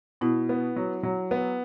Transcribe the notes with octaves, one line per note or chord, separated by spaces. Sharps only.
B2 E4
B3
F#3
F#3
B3